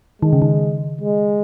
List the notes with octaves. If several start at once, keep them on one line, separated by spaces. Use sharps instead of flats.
D#3 G#3
C#3
D#3
G#3